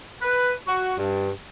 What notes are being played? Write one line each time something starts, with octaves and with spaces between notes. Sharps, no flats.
B4
F#4
G2